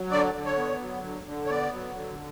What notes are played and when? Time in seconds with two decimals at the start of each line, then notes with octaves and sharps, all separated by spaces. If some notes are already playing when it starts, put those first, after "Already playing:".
Already playing: F#3
0.11 D3 D5
0.34 D3
0.46 C#5
0.57 B3
0.80 F#3
1.03 D3
1.26 D3
1.46 C#5
1.50 B3 D5
1.73 F#3
1.95 D3